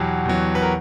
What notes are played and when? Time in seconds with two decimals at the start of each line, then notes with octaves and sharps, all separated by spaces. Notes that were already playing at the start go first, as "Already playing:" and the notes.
Already playing: E2 B2 F#3 G4
0.25 E2 B2 F#3
0.55 B4
0.62 A#4